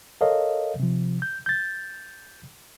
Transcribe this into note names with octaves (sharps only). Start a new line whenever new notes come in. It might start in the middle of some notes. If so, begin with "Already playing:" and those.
A4 A#4 C#5 D#5 F5
C3 F3
G6
G6 A6